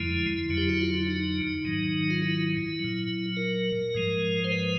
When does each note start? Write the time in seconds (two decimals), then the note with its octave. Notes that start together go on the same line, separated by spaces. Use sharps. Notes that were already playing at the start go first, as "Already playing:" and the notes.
Already playing: F2 D3 F3 G#3 E4
0.49 F2 D3 F#3
0.57 G4
0.69 F#4
0.82 F4
0.94 E4
1.07 D#4
1.64 G#2 D#3 F#3
2.10 F4
2.22 E4
2.79 A#2 F#3
3.37 A#4
3.94 G#2 F3 G#3
4.44 C5
4.52 B4